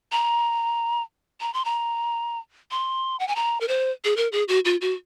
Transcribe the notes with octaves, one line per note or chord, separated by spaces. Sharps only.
A#5
A#5
C6
A#5
C6
F#5
G#5
A#5
A#4
C5
G#4
A#4
G#4
F#4
F4
F#4